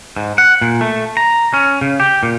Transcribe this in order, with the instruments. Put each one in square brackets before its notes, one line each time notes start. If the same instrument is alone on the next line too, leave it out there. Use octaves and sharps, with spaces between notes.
[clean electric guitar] G#2
F#5
A#2
A3
A#5
C#4
C#3
G4
A#2